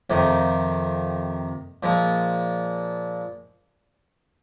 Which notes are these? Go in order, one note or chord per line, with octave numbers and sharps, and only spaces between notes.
F2 C3 D#3
A#2 F3 G#3